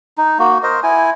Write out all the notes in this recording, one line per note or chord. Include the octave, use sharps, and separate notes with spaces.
D#4
A#3 F#4
A#4 C5 D#5
E4 G#5